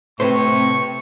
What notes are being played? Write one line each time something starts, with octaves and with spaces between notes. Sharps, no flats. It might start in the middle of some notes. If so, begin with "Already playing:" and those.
A2 C3 C4 B4 C5 C#6